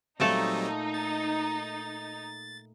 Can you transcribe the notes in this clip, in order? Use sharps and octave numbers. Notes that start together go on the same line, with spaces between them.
A#2 F#3 G3 A3 C4 D#4 A4
A6